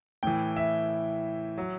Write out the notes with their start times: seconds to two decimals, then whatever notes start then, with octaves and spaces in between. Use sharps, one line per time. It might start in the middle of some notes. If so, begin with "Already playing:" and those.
0.23 A2 E3 G5
0.57 E5
1.57 F#3